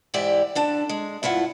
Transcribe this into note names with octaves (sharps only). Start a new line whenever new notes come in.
G#2 E3 E4 G4 D5
D3 D4 A5
G#3
G2 E4 F4 F#5